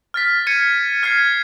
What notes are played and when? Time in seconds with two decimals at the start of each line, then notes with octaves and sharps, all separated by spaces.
0.14 F6 A6 B6
0.47 G#6 C#7 D#7
1.03 F6 G#6 C7